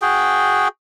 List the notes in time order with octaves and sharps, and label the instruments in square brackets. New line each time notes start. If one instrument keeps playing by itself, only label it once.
[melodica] F#4 G#4 G5